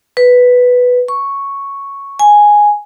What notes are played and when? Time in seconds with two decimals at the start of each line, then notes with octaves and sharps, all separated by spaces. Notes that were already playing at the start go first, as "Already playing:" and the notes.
0.17 B4
1.08 C#6
2.19 G#5